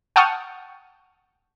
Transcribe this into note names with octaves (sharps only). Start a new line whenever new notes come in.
F#5 G5 A5 C#6 D#6 F6